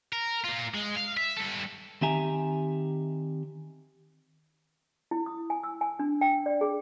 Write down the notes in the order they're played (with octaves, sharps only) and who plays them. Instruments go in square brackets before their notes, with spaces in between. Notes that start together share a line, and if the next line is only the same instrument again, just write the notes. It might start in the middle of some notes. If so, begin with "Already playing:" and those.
[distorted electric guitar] A#4
A#3 F4
G#3
F5
E5
G2 A4
[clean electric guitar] D#3 C4 G4 E5 G#5 A#5
[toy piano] E4
D#6
G#5
E6
G#5
D4
G5
D5
G#4